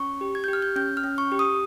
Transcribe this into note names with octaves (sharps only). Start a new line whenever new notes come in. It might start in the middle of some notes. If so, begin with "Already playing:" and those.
Already playing: C#4 C#6
G4
G#6
G6
G4
F6
G6
C#4 G6
F6
C#4
C#6
G4
D#6